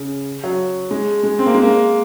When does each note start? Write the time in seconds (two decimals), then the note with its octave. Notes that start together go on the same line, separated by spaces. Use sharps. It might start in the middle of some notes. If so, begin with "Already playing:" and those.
Already playing: C#3
0.44 F#3
0.91 G#3
1.23 G#3
1.39 C4
1.47 A#3
1.55 G#3
1.62 A#3